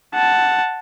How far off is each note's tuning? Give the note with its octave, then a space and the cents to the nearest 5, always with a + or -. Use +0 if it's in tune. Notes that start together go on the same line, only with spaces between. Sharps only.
F#5 +0 A5 +0